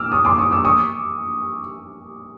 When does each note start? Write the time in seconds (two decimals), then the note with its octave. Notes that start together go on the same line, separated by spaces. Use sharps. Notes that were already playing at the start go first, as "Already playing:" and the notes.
Already playing: D6 E6 F6
0.12 C#6 D#6
0.25 C6 D6
0.38 C#6 D#6
0.51 D6 E6
0.65 C#6 D#6